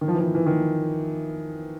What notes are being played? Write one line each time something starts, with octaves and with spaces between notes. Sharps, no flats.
D#3
F3
E3
F3
E3
E3
D#3